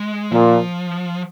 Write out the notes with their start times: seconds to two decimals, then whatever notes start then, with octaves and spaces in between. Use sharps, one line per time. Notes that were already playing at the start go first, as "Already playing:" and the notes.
Already playing: G#3
0.32 A#2 F3